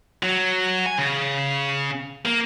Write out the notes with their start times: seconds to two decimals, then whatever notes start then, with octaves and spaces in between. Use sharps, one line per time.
0.23 F#3
0.86 G#5
0.98 C#3
2.25 A#3